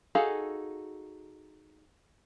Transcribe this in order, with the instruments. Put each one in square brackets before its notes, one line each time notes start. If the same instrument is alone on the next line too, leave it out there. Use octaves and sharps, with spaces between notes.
[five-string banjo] D#4 F#4 G#4 A4 F5